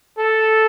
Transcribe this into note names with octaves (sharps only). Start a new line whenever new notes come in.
A4